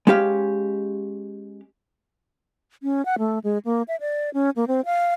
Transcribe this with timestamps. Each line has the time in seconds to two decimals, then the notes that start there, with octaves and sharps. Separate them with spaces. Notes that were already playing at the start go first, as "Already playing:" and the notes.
0.07 G#3 C#4 G4 F5
2.83 C#4
3.05 F#5
3.19 A3
3.44 G#3
3.65 A#3
3.88 E5
4.00 D5
4.34 C#4
4.56 A#3
4.68 C4
4.85 F5